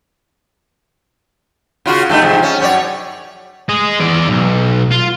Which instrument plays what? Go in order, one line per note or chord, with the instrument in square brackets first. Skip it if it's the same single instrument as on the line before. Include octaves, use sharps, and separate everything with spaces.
[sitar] C#3 F4 F#4
G2 A3 D#4
G#2 C3 F3
C#4
F#2 C#5 D5
[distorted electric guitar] G#4 D#5
E2 D5
B1
F4